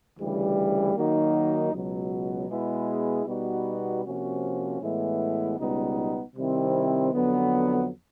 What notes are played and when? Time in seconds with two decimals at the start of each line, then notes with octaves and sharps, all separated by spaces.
0.18 D2 C#3 E3 G3
0.95 D#3 F#3 A#3 D#4 F#4
1.72 C#2 B2 F#3
2.49 B2 G#3 B3 E4 G#4
3.26 B2 G3 B3 D#4 F#4
4.03 C3 F3 A#3 C#4 F#4
4.80 A2 E3 G#3 B3 E4
5.58 C#2 B2 G3 B3 D#4
6.34 C3 D#3 G3 C4 E4
7.11 F2 D3 F#3 B3